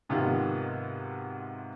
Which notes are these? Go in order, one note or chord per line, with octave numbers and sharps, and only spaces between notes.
G#2 C3 D#3 B3 F4 F#4